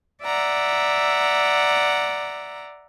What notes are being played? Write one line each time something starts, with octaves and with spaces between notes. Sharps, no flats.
D5 E5 F#5 A#5